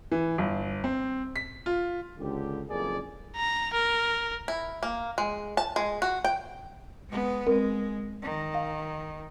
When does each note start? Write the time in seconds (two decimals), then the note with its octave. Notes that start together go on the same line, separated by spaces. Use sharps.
0.12 E3
0.38 G1
0.84 C4
1.36 B6
1.66 F4
2.19 C#2 D3 G4
2.69 F#1 F2 G#4 A#4 D5
3.36 A#5
3.73 A#4
4.48 E4
4.83 A#3
5.18 G#3
5.57 A5
5.76 G#3
6.02 F#4
6.24 G5
7.09 G#3 B3
7.47 G#3 C4 A#4
8.22 D#3
8.54 F5